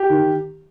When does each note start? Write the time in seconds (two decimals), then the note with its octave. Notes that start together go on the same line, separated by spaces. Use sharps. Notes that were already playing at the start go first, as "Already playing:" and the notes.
Already playing: G4
0.09 D#3